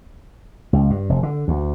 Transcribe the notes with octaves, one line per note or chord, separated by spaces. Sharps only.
C#2
G2
F1
D3
D2